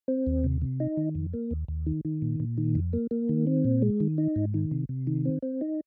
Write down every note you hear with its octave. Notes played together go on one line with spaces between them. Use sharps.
C4
D#2
C3
C3
D#4
D#3
F2
A#3
D#2
D#2
D#3
D#3
A#2
A#2
D#3
F2
A#3
A#3
D#3
C4
A#2
G#3
D#3
D#4
G#2
D#3
C3
C3
D#3
C4
C4
D#4